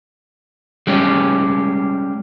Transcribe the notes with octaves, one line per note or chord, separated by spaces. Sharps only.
G3 G#3 C#4 G4